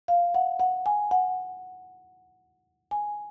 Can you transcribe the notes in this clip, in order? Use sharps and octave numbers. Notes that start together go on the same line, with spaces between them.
F5
F#5
F#5
G#5
F#5
G#5